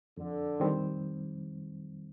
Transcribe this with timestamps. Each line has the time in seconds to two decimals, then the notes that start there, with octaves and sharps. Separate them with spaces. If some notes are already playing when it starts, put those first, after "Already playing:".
0.17 F2 D3
0.60 D#3 G3 C4